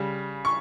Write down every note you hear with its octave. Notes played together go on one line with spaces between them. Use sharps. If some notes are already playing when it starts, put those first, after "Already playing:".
Already playing: C#3 G3
C#6